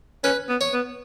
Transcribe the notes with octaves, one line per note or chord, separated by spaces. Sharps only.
C#4 B4
B3
C#5
B3